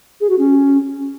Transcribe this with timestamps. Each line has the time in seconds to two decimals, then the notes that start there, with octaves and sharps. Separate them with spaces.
0.20 G#4
0.29 F#4
0.38 C#4